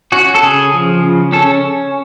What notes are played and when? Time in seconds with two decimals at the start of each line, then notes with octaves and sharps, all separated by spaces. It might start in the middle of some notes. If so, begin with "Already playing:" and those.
0.12 C#4 F#4
0.35 A4
0.42 C#3 G#4
0.74 F3
1.04 C#3
1.33 C#4 A4